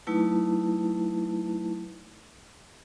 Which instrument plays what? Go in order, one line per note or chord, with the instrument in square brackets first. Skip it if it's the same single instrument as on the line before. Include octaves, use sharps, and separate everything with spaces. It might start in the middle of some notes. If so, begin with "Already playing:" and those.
[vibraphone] F#3 A3 D#4 E4 B4 A5